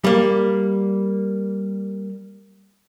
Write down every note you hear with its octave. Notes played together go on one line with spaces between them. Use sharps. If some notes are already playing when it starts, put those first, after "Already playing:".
G3 A#3